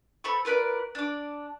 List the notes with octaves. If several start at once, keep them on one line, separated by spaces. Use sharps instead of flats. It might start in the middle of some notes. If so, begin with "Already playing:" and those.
A4 C5 B5 C#6
F4 A#4 B4 D5
D4 D6